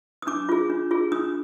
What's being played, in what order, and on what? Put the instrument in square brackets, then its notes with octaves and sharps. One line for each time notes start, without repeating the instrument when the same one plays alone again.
[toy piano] D#6
D4 D6
F4 G#4
D4
F4 G#4
D4 D#6